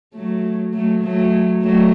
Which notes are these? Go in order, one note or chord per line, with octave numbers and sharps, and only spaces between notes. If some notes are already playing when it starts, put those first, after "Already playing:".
F#3 A3
F#3 A3
F#3 A3
F#3 A3